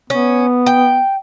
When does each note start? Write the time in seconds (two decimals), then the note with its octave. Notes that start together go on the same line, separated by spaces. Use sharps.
0.10 B3 C#4
0.66 G5